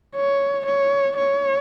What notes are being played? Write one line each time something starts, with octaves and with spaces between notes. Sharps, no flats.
C#5
C#5
C#5